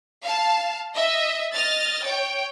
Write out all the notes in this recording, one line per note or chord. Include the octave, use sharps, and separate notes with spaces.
F5 A5
D#5 E5
D#5 F6 A6
C#5 G5